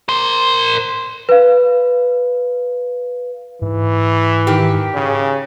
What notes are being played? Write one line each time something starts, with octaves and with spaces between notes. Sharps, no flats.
A#4 C5
B4 F5
G#2 E3
D#3 G4
C#3